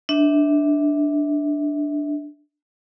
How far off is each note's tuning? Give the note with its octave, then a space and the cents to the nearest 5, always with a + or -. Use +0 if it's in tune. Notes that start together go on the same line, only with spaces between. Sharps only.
D4 +0 E5 -25